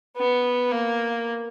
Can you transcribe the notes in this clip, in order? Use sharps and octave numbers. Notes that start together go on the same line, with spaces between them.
B3
A#3